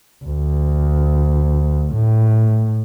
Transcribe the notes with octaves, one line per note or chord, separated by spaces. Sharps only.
D2
A2